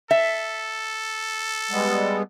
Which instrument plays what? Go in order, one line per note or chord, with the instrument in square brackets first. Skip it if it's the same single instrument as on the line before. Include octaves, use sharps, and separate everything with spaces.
[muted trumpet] A4 [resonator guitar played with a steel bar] E5
[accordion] G3 G#3 B3